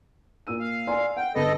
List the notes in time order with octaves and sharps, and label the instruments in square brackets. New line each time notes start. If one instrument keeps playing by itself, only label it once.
[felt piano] A#2 E6 D#7
[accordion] F5
[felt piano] D5 G#5 C6
[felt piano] F#5 [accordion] G5
[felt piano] G1 B4 B5 [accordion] A4 D#5